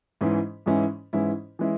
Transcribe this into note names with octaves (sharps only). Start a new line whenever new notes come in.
G#2 E3 G#3 C#4 E4
G#2 E3 G#3 C#4 E4
G#2 E3 G#3 C#4 E4
E3 G#3 C#4 E4